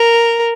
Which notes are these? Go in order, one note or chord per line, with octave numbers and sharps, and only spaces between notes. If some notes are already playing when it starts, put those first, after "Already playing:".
Already playing: A#4